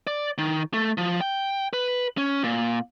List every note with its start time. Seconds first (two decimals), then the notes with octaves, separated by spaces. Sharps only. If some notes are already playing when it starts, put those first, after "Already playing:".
0.07 D5
0.38 D#3
0.73 A3
0.98 F3
1.21 G5
1.73 B4
2.18 C#4
2.43 A#2